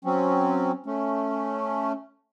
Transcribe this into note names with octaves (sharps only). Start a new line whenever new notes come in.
F#3 C4 C#4
A3 C#4